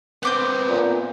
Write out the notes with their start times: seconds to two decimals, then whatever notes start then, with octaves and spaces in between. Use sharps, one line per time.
0.23 B3 C4 B4 D6 G6
0.68 A#2